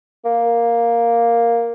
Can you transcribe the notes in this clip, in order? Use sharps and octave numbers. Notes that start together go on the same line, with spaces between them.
A#3